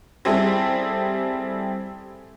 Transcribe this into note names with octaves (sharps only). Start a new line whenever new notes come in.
G3 C4 E4 G#4 A4